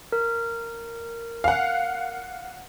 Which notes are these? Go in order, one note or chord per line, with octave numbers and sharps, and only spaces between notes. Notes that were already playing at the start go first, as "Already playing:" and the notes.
A#4
F5 F#5